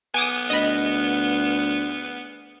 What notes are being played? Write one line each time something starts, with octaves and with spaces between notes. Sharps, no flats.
B3 G#5 D6 D#6
D2 D#5 B5